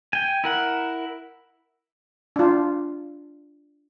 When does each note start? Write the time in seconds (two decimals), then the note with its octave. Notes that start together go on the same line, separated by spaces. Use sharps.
0.13 G5 G#5
0.44 E4 A#4 F#5
2.36 D4 F4